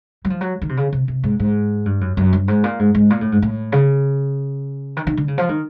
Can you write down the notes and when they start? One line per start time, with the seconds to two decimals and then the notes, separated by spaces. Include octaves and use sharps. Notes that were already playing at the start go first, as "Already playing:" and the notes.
0.25 F#3
0.30 F3
0.41 F#3
0.62 D#3
0.69 C3
0.77 C#3
0.93 C3
1.08 C3
1.23 G#2
1.39 G#2
1.85 G2
2.01 F#2
2.17 F#2
2.33 G2
2.48 G#2
2.64 A#2
2.79 G#2
2.95 G#2
3.10 A#2
3.21 A2
3.32 G#2
3.42 A2
3.72 C#3
4.97 D#3
5.07 D#3
5.17 D3
5.28 C#3
5.38 F3
5.49 D#3